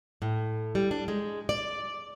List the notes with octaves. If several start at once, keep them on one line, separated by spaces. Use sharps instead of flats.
A2
G3
D4
G#3
D5